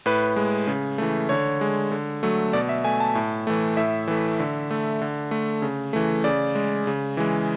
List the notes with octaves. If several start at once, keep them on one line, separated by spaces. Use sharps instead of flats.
A2 B4
G#3
C#3
E3 A3
D3 C#5
G#3
D3
F#3 A3
B2 D5
E5
A3 G#5
A5
A2
E3 A3
A2 E5
E3 A3
D3
A3
D3
A3
C#3
E3 A3
C#3 D5
G#3
C#3
E3 G#3